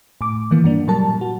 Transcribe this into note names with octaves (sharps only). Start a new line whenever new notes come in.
A2 D6
D#3 E3 A#3
G2 A#3 D4
A#2 F#3 G3 A#4 A5
F#4